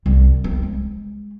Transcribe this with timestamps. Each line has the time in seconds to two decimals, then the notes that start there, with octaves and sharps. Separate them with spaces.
0.06 C2 G3
0.44 C4
0.63 G#3